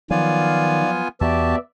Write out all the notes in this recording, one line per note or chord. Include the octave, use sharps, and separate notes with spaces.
D#3 F3 F#3 B3 F4 D5 F5 G#5
E2 B3 F#4 G4 D5 E5 A5